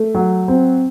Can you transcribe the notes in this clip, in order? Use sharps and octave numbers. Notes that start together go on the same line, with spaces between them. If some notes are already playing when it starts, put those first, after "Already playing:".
Already playing: A3
F#3
C4